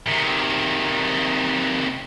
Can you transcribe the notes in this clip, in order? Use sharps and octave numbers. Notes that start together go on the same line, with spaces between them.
C3 D#3